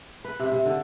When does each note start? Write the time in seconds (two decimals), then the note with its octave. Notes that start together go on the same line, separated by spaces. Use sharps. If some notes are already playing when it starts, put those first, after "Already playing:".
0.25 B4
0.39 C3
0.52 C3
0.66 D3